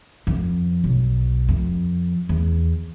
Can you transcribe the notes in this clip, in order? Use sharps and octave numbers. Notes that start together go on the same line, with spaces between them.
F2
B1
F2
E2